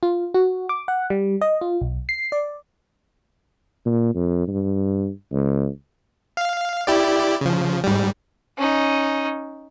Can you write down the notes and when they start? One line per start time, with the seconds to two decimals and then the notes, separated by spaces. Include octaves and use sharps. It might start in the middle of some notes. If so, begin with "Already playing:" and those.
0.03 F4
0.34 F#4
0.69 D6
0.88 F#5
1.10 G3
1.41 D#5
1.61 F4
1.81 B1
2.09 C7
2.32 D5
3.86 A#2
4.15 F2
4.48 G2
5.32 C#2
6.37 F5
6.87 E4 G4 D5
7.41 C#3 F3
7.84 G#2 G3
8.57 C#4 D#4